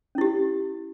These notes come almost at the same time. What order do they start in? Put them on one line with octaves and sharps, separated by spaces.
C#4 E4 G4